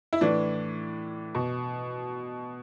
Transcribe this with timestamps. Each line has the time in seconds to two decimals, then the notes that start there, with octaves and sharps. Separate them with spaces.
0.13 E4
0.21 A2 E3 D4
1.35 B2